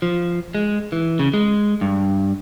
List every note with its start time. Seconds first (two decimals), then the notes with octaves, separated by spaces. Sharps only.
0.02 F3
0.55 G#3
0.92 E3
1.19 C#3
1.34 G#3
1.81 G2